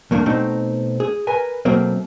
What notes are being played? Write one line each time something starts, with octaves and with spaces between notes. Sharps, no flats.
E2 A3 A#3 D4
B2 A3 C4 D#4
G#4
A#4 B4 G#5
B2 F#3 A3 A#3 C4